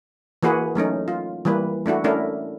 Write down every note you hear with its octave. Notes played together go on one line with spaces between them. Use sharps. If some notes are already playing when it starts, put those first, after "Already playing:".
E3 A#3 F#4 G#4 B4
F#3 A3 C#4 D#4
F4
E3 G3 A#3 B4
A3 D4 E4 F#4
A3 C#4 D4 E4 A#4